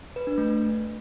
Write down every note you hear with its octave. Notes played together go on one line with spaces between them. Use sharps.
B4
D4
A3